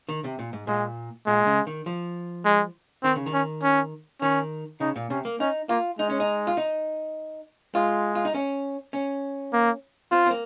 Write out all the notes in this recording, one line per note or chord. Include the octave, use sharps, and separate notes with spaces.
D#3
C3
A#2
G#2
A#2 G#3
A#2 G#3
C#3
D#3
F3
G#3
D#3 C4
C#3
D#3
C#4
C#4
D#3 C#4
C#3 D#4
A#2
C3 C#4
A#3
C#4 D#4
A#3 F4
G#3 D#4
C#4
D#4
F4
D#4
G#3 F4
F4
D#4
C#4
C#4
A#3
C4 F4
C4
A#3